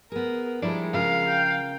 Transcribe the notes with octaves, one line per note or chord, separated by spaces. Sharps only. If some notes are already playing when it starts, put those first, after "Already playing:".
B3 G#4 A#4
F3 G3 G#3 D4 E4 A#4 D5
C#3 F4 A#4 F5
G5